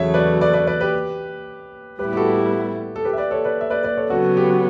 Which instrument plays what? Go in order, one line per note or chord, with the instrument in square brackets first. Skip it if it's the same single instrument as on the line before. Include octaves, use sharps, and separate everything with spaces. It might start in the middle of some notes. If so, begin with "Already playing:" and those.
Already playing: [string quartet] E2 C#3 F#3 A3 [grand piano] C#5 E5
[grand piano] B4 D5
B4 D5
B4 D5
B4 D5
G4 B4
[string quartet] A2 G3 B3 E4 [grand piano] G4 B4
[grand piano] G4
F#4 A4
G4
A4
G4 B4
E5
B4 D5
A4 C#5
B4 D5
E5
B4 D5
B4 D5
A4 C#5
[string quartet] C#3 F#3 B3 [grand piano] F#4 A4
[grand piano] G4